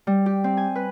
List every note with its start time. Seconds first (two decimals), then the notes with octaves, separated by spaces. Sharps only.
0.07 G3
0.26 G4
0.44 C4
0.57 G#5
0.75 B4